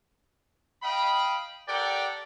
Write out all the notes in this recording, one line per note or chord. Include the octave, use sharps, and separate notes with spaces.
D#5 F5 G5 B5
G4 A4 A#4 D5 F#5 G5